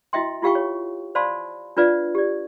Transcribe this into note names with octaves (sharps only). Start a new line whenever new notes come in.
E4 F#4 D#5 E5 G5 C6
E4 F4 G4 F5 G5 C#6
C#5
C5 D5 F5 A5 B5 C6
D4 F4 B4 D5 F5
G4 D5